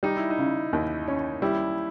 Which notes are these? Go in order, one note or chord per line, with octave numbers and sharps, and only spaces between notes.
G3 D#4
E4
D#4
C#3
D#2
C#4
G3 E4